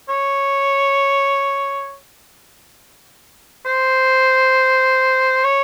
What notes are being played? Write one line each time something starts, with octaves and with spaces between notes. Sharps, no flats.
C#5
C5
C#5